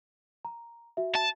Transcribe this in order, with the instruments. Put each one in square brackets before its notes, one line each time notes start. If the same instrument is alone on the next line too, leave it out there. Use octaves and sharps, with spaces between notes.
[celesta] A#5
F#4 E5
[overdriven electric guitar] A5